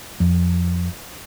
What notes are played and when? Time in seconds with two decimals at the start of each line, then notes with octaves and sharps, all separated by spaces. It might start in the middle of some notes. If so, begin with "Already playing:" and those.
0.20 F2